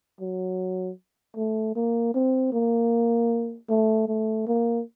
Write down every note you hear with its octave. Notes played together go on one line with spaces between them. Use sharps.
F#3
A3
A#3
C4
A#3
A3
A3
A#3